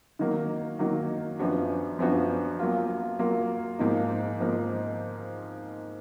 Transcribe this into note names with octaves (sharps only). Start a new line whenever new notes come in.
D#3 F#3 A#3
D#3 F#3 A#3
F#2 F3 B3 D4 F#4
F#2 F3 B3 D4 F#4
F#3 A#3 F4
F#3 A#3 F4
G#2 F3 A#3 D#4
G#2 F3 A#3 D#4